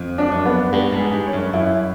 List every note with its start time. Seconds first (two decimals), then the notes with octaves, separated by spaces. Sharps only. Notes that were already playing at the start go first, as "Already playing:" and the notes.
Already playing: F2
0.18 D4
0.31 F#2
0.45 B3
0.72 G2 B3
0.92 G#2
0.99 G#4
1.13 G2
1.27 C#5
1.33 F#2
1.53 F#2 E4